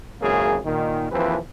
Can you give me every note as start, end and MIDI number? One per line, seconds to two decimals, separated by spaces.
0.21 0.58 32
0.21 0.58 37
0.21 0.58 42
0.21 0.58 49
0.21 0.58 58
0.21 0.58 68
0.65 1.06 46
0.65 1.06 51
1.11 1.36 39
1.11 1.36 52
1.11 1.36 53
1.11 1.36 60
1.11 1.36 68
1.11 1.36 71